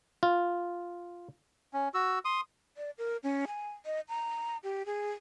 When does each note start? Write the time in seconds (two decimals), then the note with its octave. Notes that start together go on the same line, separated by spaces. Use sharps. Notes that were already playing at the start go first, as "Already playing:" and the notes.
0.23 F4
1.74 C#4
1.94 F#4 E6
2.25 C6 D#6
2.77 D5
2.98 A#4
3.23 C#4
3.48 G#5
3.86 D#5
4.09 A#5
4.64 G4
4.86 G#4